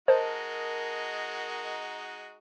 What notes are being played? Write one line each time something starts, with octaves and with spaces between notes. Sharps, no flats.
G#3 D#4 F#4 A#4 C5 D#5 A5